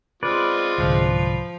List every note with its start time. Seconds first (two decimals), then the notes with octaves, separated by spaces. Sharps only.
0.23 G#3 C4 F4 B4 D5
0.78 C2 G#2 D3 F3